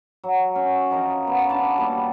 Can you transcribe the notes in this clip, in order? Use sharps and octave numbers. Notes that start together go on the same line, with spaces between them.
F#3
C#4
F3 D#4 A#4 A#5
B3
D4 A5 C#6
A#2 G3